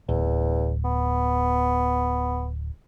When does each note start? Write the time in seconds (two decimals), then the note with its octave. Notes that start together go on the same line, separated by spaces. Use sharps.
0.09 D1 E2
0.85 B3